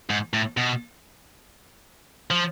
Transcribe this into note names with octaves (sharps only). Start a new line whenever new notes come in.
G#2
A2
B2
F3